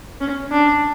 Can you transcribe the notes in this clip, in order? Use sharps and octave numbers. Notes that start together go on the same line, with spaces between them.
C#4
D4